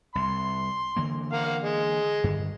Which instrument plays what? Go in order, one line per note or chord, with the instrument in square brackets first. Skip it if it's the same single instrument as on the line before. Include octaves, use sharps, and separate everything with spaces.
[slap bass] C2 [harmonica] C6
[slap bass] D3 E3 A#3
[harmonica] A#4 F5 F#5
G#3
[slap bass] G2 D3 D#3